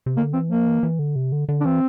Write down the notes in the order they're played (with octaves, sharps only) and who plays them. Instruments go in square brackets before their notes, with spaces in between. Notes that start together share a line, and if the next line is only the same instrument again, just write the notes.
[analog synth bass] C3
[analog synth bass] D3 [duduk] A#3
[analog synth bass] E3 [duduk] C4
[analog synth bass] F3 [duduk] A#3
[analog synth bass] E3
E3
D3
C3
D3
D3
[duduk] D4
[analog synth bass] E3 [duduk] C4